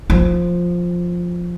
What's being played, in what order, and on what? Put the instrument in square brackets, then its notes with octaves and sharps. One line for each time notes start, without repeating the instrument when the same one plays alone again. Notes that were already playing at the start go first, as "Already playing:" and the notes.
[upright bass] F3